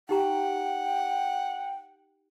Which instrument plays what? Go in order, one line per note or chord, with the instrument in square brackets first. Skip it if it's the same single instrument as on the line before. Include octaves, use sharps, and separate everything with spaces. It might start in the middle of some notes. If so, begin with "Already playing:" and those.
[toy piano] D#4 G4 A#5 [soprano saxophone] F#5 [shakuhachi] G5